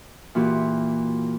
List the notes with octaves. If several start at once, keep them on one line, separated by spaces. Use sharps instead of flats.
A#2 E3 F#4 G4